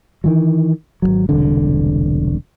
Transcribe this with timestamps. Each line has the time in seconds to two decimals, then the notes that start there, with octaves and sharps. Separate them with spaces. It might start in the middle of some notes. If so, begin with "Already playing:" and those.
0.24 D#3 E3 F#3
1.02 G#1 D#2 F#3
1.29 E1 C2 D3